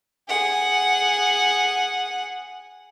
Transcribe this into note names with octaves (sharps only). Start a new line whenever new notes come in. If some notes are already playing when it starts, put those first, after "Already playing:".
G#4 F#5